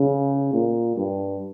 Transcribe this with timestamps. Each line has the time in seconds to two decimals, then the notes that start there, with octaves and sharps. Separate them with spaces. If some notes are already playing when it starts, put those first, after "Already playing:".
Already playing: C#3
0.53 A#2
0.97 G2